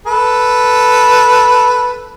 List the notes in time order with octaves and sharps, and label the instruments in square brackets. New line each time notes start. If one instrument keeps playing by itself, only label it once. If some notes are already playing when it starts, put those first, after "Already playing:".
[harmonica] A4 B4